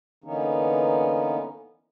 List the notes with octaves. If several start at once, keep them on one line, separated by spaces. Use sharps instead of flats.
D3 E3 A#3 B3 C#4 D#4